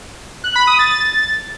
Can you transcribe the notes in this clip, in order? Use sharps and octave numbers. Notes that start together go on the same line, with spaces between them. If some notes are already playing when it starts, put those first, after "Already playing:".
F#6
B5
D#6
A6
A6